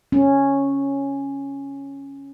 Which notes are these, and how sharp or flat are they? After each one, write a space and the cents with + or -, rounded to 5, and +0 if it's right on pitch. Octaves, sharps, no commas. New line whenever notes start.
C#4 -5